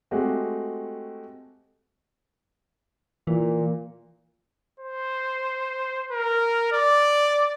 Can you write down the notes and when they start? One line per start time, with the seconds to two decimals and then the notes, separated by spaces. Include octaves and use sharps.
0.11 G#3 A3 C4 F#4 G4
3.27 A#2 E3
4.80 C5
6.11 A#4
6.72 D5